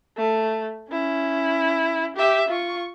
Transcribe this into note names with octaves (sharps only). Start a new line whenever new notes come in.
A3
C#4 E4
G4 E5
F4 C#6